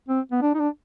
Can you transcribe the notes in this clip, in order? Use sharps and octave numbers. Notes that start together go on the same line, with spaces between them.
C4
B3
D4
D#4
D4